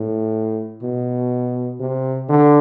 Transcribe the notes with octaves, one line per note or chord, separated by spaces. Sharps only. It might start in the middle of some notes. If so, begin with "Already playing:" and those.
Already playing: A2
B2
C3
D3